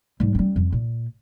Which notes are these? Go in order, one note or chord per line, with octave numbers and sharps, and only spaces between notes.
G#2 G3
G3 C#4
F2
A#2